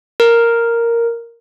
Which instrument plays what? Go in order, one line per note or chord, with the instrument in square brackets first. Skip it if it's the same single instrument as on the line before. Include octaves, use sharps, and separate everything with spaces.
[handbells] A#4